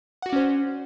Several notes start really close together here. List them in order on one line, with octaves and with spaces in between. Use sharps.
F#5 F#4 D5 C#4 C5